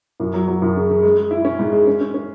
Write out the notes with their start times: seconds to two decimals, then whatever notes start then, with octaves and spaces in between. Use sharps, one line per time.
0.20 F#2
0.34 F#3
0.48 F#3
0.62 F#2
0.76 C#3
0.90 C#3
1.03 G#3
1.18 G#3
1.31 E4
1.45 C#4
1.59 G#2
1.73 G#3
1.87 C#4
2.01 C#4
2.14 C#4